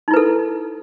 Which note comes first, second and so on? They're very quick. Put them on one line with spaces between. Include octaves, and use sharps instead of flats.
D#4 E4 B4 A4